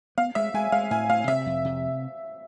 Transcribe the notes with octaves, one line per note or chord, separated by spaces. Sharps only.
B3 F5
G#3 E5
G#3 G#5
G#3 F5
A2 G#5
A2 F5
C3 E5
F2
C3